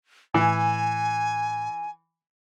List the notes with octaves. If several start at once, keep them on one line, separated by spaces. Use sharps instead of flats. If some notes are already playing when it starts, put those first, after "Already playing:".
A2 E3 G#5